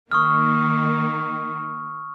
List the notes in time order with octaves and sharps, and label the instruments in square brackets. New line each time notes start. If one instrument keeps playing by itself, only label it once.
[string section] D#3 A#3 [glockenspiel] C#6 D#6 F6